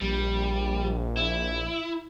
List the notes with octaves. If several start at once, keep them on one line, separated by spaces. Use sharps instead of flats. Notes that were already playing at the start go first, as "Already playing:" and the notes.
A#1 G3
E4